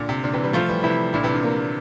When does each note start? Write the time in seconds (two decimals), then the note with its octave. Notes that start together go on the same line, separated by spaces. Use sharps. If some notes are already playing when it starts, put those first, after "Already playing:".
Already playing: A#2 D3
0.09 C3
0.24 A#2 D3
0.33 C3 E3
0.44 E3 G3
0.53 F3 A3 F4
0.69 E3 G3
0.83 C3 E3 E4
1.13 A#2 D3 E4
1.23 C3 E3
1.33 A#2 D3
1.43 A#3